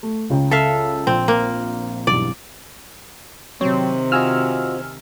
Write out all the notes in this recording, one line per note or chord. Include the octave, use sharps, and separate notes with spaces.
A3
C#2 C#3 G5
A4 E5 F5
A#1 C4
A#3
B1 E2 G2 D5
C3 D#3 F#3 C4 C#5
F4 F#4 D#5 G#5 E6 F6